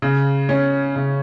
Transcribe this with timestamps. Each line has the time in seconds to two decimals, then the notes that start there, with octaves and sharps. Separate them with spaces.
0.02 C#3
0.49 C#4
0.96 C#3